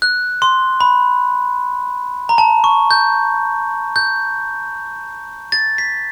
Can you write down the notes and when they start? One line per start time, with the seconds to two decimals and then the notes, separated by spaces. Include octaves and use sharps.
0.02 F#6
0.42 C6
0.81 B5
2.29 A#5
2.38 A5
2.64 C#6
2.91 G6
3.96 G6
5.52 A6
5.78 B6